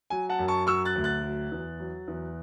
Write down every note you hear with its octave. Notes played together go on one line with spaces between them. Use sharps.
F#3 G#5
F#5 A5
F#2
A5 C#6
F#3 C#6 E6
F#6 A6
D2
F#6 A6
F#3
E2
F#3
E2